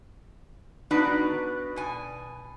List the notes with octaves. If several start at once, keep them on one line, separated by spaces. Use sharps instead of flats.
B3 D4 D#4 F#4 B4
B2 G#5